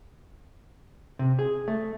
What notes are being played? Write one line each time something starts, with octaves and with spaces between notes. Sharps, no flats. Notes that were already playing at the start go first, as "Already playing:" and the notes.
C3
G#4
A3